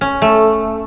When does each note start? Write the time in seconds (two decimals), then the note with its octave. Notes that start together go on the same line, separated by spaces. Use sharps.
0.01 C#4
0.22 A3